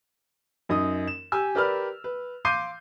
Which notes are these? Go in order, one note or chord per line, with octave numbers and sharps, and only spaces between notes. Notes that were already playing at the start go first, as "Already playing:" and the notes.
F#2 D#4 D#6
E7
G4 G#5 E6
G4 A#4 B4 D5 B5 F6
B4
F5 C6 D6 G6 C7 D#7